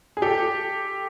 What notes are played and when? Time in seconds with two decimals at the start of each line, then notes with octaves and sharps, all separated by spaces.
0.17 G#4
0.22 G4 A4